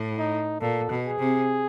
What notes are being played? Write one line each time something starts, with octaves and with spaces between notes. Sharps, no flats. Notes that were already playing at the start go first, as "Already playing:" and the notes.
Already playing: A2
D#4
A#2 A4
B2
G#4
C3